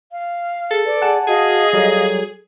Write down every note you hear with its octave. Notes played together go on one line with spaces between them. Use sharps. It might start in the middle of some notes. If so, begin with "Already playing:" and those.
F5
G#4 A4
B4 D5
G#4 F#5 G#5 A5
F#4 G#4 D#5 F5 D#6
F#3 G3 A4